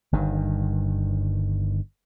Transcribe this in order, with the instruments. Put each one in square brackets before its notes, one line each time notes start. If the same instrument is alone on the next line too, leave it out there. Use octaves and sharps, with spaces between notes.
[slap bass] G1 G2 D#3